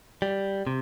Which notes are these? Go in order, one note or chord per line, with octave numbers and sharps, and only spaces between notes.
G3
C3